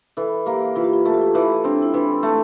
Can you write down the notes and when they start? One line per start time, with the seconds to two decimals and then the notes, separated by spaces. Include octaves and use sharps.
0.17 E3 A4
0.46 A#3 G4
0.76 E3 F4
0.84 G4
0.93 F4
1.05 A3 F4
1.14 G4
1.22 F4
1.34 E3 E4
1.64 C4 D4
1.82 E4
1.94 E3 D4
2.23 A3